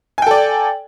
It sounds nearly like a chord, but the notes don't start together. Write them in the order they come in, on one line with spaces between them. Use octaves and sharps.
G#5 G5 A4 D5